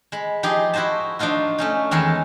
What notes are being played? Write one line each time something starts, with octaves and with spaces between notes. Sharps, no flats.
G#3 B5
F3 D#4 G4 G#4
E4 F#4 C5 D#5 A5
F3 D4 D#4 F4 F#4
A3 C#4 D#4
E2 D#3 G#3 A4 A#4 G#5